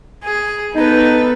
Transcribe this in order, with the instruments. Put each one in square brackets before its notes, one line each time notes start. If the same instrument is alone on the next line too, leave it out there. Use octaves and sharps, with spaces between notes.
[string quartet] G#4
[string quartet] B3 A4 B4 [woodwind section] D#4